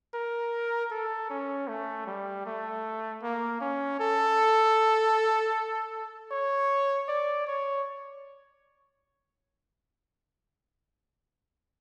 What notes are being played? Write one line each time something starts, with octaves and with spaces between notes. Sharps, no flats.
A#4
A4
C#4
A3
G3
A3
A#3
C#4
A4
C#5
D5
C#5